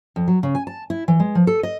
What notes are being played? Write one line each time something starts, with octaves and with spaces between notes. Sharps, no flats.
F2
F#3
C#3
G#5
A5
E4
E3
G#3
F3
A4
D#5